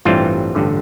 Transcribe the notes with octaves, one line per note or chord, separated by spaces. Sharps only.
A1 G2 E3 G3 C4 F4
A1 G2 D3